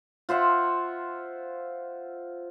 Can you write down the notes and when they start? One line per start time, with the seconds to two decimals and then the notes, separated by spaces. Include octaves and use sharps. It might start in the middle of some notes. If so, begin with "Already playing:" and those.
0.29 F4 C5 E5 F#5